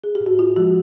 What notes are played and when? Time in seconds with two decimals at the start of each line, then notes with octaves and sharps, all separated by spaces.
0.04 G#4
0.15 G4
0.20 A2
0.26 F#4
0.39 F4
0.56 F3 G#3 F#4